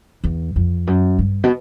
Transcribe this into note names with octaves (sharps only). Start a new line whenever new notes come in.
E2
F2
F#2
G2
B2